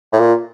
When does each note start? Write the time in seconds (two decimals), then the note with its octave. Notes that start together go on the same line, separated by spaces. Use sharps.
0.13 A2
0.20 A#2